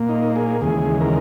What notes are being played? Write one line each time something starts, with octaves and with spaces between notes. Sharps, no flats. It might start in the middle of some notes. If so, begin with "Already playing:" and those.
Already playing: A#2 A#3
D#4
G#4
D#2 C#3 E3 G#3 G#4
A#4